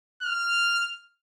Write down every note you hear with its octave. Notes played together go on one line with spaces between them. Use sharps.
F6